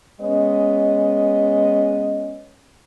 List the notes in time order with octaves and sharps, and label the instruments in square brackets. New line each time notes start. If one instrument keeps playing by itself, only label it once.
[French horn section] G#3 B3 C#4 D#5